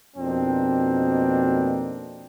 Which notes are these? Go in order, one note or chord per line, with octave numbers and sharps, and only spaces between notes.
F2 B2 A#3 C4 D4 D#4